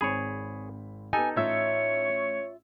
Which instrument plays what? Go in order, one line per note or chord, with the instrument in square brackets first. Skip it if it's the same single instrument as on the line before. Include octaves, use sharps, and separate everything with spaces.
[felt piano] G#1 C4 B5 [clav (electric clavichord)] G#4 C#5
[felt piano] B3 G4 [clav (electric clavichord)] D#4 A4 [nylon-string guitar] G#5
[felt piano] A1 E6 G#6 [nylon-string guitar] F4 E5 [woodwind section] C#5